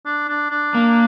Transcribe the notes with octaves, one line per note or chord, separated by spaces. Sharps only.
D4
D4
D4
A#3